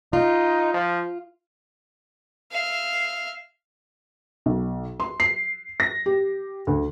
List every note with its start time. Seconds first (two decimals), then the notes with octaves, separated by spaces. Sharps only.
0.13 D#4 F4
0.74 F3
2.52 E5 F5
4.46 B1
5.00 C6
5.20 C7
5.80 A#6
6.06 G4
6.67 D2